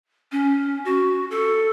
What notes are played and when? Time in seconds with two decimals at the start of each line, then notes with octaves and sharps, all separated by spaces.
0.32 C#4
0.85 F#4
1.31 A4